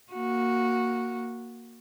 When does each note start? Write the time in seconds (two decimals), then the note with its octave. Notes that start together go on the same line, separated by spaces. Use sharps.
0.12 A#3 F#4